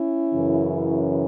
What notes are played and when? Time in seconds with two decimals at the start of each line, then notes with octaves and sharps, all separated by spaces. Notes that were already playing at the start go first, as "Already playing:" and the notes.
Already playing: C#4 E4
0.32 F#2 C#3 E3